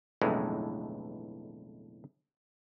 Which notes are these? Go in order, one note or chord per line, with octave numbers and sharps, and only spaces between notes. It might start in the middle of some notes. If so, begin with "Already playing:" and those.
B1 F2 A2 D3 E3 G#3